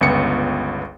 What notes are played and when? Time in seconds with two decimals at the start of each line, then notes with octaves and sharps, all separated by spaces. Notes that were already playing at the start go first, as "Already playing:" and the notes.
0.01 G1 C#2 B3 C#7